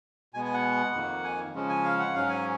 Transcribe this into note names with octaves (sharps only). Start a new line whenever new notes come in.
B2 G#3 B3 G#5
G#5
F#5
F2 D#3 A#3
G#5
C#3 F3 G#3 C#4
G#5
F5
F#5
G#2 F#3 C#4 F5
G#5